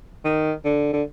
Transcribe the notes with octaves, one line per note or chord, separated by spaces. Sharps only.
D#3
D3
D3